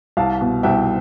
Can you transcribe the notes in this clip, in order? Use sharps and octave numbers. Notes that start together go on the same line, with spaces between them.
C2 F5 A5
B2
C2 E5 G5